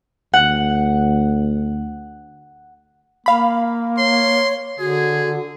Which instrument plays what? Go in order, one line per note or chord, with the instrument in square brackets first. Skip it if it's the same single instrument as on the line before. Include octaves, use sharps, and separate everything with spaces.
[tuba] D2 [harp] F#5
[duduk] A#3 [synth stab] F5 B5
[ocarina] C#5 [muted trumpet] C6
[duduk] D3 [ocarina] F#4 [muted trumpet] G#4